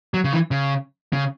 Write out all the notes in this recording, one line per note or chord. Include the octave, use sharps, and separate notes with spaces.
F#3
C#3
E3
C#3
C#3